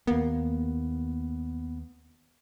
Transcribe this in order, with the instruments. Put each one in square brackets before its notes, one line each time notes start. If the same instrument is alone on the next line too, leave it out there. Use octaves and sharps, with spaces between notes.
[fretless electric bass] D#2 A#3 [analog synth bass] B3